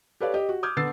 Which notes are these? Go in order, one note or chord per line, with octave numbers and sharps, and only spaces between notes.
G4 A4 B4 C#5 D5 F5
G4 D#5
F#4
D6 D#6 F6 G6 G#6
D3 B3 B4 E6 A6 C7